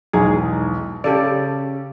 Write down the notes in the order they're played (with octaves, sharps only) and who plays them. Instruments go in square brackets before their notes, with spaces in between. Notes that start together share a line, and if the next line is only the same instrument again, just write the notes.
[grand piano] B1 E2 G#2 [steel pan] G#4
[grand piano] C#3 [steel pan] G4 A4 D5